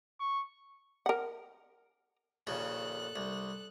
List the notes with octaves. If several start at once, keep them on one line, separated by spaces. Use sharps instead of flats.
C#6
A#4 F#5
A#1 D#2 C#3 A4 F#6
C2